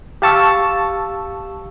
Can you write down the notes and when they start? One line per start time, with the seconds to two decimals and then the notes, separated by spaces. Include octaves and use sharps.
0.22 G4 F5 A5 C#6 E6